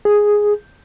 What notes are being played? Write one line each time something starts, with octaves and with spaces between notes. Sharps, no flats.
G#4